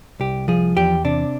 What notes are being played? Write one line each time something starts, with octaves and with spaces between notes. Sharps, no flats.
C2 G4
F3 G#4
E2 G4
C3 D4